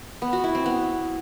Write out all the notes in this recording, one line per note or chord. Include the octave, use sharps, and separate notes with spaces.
B3
F#4
E4
C4
B3